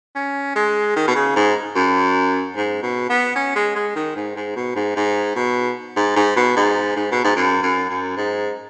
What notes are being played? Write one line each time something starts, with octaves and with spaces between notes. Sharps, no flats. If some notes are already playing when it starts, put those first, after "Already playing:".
C#4
G#3
D#3
B2
C#3
G#2
F#2
G#2
B2
B3
C#4
G#3
G#3
D#3
G#2
G#2
B2
G#2
G#2
B2
G#2
G#2
B2
G#2
G#2
B2
G#2
F#2
F#2
F#2
G#2